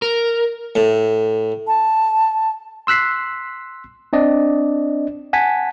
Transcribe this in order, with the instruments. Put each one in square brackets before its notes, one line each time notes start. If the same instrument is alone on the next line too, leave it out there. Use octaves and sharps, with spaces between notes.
[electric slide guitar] A#4
[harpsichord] A2
[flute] A5
[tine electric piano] C6 E6 F#6 B6 C7
C4 D4 D5 D#5
F#5 G#5 A5 B6